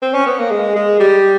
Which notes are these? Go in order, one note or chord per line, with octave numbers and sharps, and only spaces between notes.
C4
C#4
B3
A#3
G#3
G#3
G3